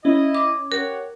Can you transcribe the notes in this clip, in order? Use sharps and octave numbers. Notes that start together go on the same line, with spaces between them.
C#4 E4 D#5
D6
G4 A#4 C#5 F#5